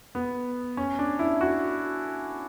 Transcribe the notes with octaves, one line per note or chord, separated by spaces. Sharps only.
B3
C#4
D4
E4
F#4